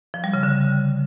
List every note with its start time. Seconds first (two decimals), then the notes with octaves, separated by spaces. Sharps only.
0.14 F3
0.24 G3
0.34 C#3
0.43 D3